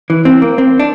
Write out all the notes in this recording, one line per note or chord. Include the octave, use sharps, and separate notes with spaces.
E3
C4
A#3
C4
D4